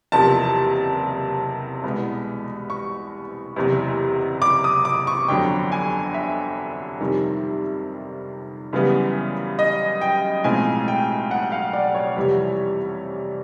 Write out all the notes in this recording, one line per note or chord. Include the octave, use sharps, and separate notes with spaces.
F#1 E2 C3 F3 A#3 A5
C2 B2 G#3 B3
C#6
F#1 E2 C3 E3
D6
D#6
D6
C#6
G1 F2 D3 F#3 G5
G#5
E5
F2 C3 D#3 G3
F#2 C#3 E3 G3 B3
D#5
G5
B1 A2 F3 G#3 C4 G#5
G5
F#5
F5
D5
C#5
F2 C3 E3 G3